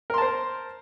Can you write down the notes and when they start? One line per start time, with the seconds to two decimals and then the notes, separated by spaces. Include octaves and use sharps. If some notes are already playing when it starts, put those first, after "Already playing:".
0.10 A#4
0.14 C6
0.18 A5
0.22 C5